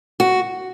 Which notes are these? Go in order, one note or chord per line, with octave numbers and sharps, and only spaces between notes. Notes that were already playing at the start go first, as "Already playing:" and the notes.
F#4